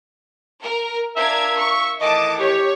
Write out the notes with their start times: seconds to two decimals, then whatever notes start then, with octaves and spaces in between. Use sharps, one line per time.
0.62 A#4
1.16 D4 F4 A#4 E5 G#6
1.57 C#6
2.01 A2 D#3 E3 D#5 A5 D6
2.39 G4 C#5